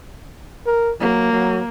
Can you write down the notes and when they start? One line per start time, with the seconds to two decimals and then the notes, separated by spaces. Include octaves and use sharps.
0.67 A#4
1.00 F#3 A#3
1.32 F#3